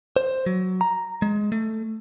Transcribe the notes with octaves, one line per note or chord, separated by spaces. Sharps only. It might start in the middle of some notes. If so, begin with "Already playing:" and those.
C5
F#3
A#5
G#3
A3